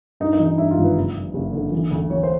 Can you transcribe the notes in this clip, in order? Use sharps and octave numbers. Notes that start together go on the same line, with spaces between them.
G2 D#4
D#4
E3
D#4
G2 E4
F4
G#1
B4
F#1
F#1
F#1
D3
E3
D2
E3 C#5
C5